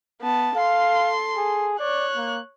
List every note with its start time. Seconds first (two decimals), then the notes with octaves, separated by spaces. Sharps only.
0.22 B3 A5
0.57 A4 F5 C6
1.37 G#4
1.80 C#5 D5 F#6
2.17 A#3